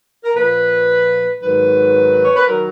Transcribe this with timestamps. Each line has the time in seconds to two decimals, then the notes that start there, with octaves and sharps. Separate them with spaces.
0.24 A#4
0.35 A#2 F3 B4
1.41 G#2 D#3 F#3 B4
2.25 C#5
2.36 B4
2.47 D#3 F#3 A#4